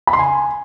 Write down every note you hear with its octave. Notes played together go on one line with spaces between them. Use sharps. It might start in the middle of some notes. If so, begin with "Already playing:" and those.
B5
C6
G#5